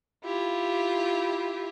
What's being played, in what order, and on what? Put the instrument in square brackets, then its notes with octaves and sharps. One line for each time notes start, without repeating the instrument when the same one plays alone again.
[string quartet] E4 F4 G4